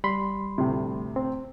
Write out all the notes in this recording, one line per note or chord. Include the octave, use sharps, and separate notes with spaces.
G3 B5 C6
D2 A2 C3
C4